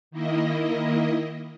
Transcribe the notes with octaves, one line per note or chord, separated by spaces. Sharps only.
D#3 A#3 E4 D#5